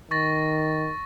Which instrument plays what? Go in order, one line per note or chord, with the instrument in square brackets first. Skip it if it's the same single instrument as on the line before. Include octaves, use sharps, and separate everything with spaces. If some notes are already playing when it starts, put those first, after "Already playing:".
[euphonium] D#3 [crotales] C#6 A6 A#6